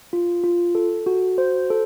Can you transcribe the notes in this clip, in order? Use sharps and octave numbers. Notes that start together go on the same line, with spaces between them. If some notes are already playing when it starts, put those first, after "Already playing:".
F4
F4
A4
F#4
C5
A4